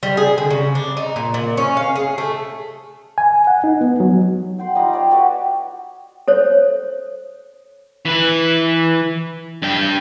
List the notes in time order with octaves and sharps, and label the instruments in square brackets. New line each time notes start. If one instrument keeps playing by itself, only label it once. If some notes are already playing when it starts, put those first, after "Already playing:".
[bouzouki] G3
G#4
D3
C#3
D4
D#4
A#2
A#2
C#4
F5
G#4
A3
[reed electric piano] G#5
F#5
D#4
B3
F#3
[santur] F#5 G5 C6
G3 D#4 F4 D6
C#5 D5
F#4 G4 B4 D5
[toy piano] A4 C5 C#5
[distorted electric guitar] E3 B4
G2 G5